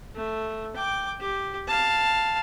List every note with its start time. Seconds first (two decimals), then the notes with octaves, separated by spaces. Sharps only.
0.16 A3
0.76 G5 D6
1.20 G4
1.67 F5 A5